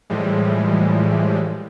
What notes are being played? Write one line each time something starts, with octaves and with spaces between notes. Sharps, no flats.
A2 E3 F3 G3 G#3